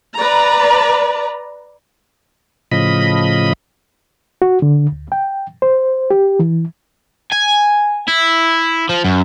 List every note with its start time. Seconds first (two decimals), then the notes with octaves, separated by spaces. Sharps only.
0.15 B4 D5 A#5
2.72 A2 C#3 F3 D#5 B5
4.42 F#4
4.62 D3
4.92 D2
5.12 G5
5.62 C5
6.11 G4
6.39 E3
7.32 G#5
8.08 E4
8.89 F3
9.04 F#2